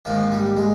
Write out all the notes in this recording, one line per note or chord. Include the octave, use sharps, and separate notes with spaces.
A#1 G#2 D#3 F3
G3
G#3